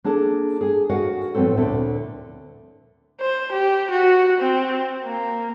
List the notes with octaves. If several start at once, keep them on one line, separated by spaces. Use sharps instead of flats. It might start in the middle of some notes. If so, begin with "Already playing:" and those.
A#3 D4 G#4 A4 A5
G#4 G#5
F#4 A#4 D#5 F5 F#5
A2 F3 F#3 B3 C4 A4
D2 A#2 D3 E5
C5
G4
F#4
C4
A#3